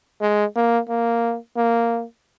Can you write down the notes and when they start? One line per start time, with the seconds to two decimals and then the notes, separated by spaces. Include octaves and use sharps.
0.21 G#3
0.55 A#3
0.89 A#3
1.57 A#3